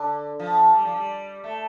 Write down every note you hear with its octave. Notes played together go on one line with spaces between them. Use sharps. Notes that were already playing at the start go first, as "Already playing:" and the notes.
Already playing: D3
F3
G3
F3
G3
A3